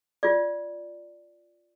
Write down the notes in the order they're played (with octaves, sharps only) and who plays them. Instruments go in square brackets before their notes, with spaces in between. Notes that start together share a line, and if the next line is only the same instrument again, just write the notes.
[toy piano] F4 D5